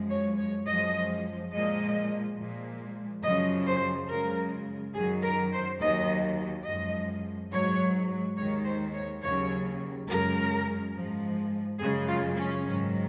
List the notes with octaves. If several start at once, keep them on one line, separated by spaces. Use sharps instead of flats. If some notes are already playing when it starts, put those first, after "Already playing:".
Already playing: F#2 F3 G#3
C#5
C#5
F#2 F3 G#3 D#5
A#2 F3 G#3 D#5
A#2 F3 G#3
F#2 C#3 F3 D#5
C5
F#2 C#3 G#3 A#4
F#2 D#3 F#3 G#4
A#4
C5
D#2 D#3 F#3 D#5
F#2 F3 G#3 D#5
G#2 F#3 C#5
D#2 D#3 G#3 C#5
C5
C#5
D#2 C#3 F#3 C#5
F#2 C#3 G#3 A#4
G#2 F3 G#3
F#2 C#3 G#3 G#4
F4
C#4
G#2 D#3 F#3